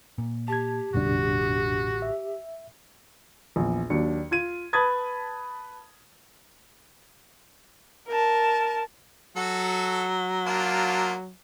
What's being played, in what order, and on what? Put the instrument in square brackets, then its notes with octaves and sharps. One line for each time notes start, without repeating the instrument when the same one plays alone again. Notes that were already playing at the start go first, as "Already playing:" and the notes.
[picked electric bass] A#2
[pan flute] G4 [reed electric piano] A5 G#6
[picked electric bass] A1 D3 G3 [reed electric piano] F2 B2 D4 [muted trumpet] F#4
[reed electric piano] E5
[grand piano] A#1 E2
D#2 F#3 D4 C#7
F4 G#6 D#7
B4 A5 B5 D#6 G#6 A6
[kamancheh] A#4 A5
[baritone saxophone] F#3 [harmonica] F#4 A4
[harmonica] A#3 D4 F4